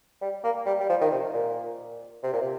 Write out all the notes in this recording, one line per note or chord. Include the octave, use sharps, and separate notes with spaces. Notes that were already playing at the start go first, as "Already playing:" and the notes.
G3
A#3
G3
G3
F3
D#3
C3
A#2
C3
A#2
C3